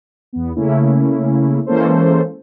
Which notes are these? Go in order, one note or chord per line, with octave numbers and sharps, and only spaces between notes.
E2 B3
C#3 A3 A#3 C#4 E4
E3 G#3 A#3 C#4 A4 C5